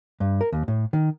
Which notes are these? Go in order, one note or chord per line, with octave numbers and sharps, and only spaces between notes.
G2
A#4
D#2
A2
D#3